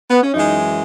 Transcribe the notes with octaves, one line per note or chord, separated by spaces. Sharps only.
B3
C#4
F#2 E3 G#3 D#4